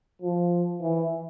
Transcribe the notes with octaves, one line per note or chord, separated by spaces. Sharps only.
F3
E3